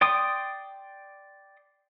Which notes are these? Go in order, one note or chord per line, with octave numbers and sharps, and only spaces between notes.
D5 G5 C6 D#6